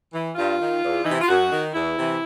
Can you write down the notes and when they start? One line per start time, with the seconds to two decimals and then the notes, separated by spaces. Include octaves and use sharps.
0.13 E3
0.36 G2 F4
0.59 D#3
0.82 E2
1.04 C3 E3 D#4
1.13 E4
1.21 F4
1.28 F#2 F#4
1.51 D#3
1.74 E2 E4
1.97 C3 E3